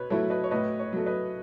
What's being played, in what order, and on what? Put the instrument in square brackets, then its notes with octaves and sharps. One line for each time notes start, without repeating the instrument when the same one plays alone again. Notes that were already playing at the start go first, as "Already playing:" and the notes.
Already playing: [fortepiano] B2 [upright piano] B4 C#5
[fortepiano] F#3 A3 E4 [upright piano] C#5
[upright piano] B4 D#5
C#5
[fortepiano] A2 [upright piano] B4 D#5
[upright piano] C#5
[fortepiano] F#3 A3
[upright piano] B4 D#5